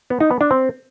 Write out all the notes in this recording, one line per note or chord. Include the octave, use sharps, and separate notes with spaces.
B3
D#4
B3
D4
C4